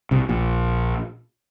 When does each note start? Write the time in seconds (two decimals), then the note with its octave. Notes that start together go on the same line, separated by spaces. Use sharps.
0.11 C2 C3
0.29 A#1 A#2